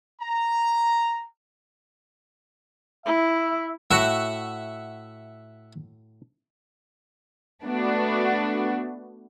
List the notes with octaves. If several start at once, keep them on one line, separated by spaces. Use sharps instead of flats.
A#5
E4 E5
A2 F#4 E5 F#5
A3 B3 D4 F#4